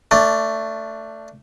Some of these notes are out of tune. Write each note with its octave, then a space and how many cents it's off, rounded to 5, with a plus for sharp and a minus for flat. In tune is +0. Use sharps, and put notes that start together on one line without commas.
A3 +15 D4 -5